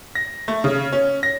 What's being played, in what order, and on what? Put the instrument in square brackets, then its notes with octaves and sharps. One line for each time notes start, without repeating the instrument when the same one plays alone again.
[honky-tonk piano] A#6
A3
C#3
C#4
A#6